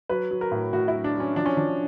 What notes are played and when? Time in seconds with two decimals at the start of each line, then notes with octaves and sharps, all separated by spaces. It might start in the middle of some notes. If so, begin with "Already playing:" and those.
0.09 F#3 B4
0.31 F#3
0.41 A#4
0.52 A2
0.73 A2 F#4
0.88 E4
0.94 F#3
1.04 D4
1.15 F#3
1.20 C#4
1.36 F3 D4
1.46 C#4
1.57 F3 D4